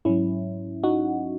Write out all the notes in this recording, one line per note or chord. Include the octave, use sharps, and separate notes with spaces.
G#2 F#3 C#4 E4
D#4 F#4